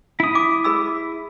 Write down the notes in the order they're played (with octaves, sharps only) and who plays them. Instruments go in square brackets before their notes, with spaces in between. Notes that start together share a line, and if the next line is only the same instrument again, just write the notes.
[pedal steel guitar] E4 D#6
[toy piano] D6
G#4 B5 E6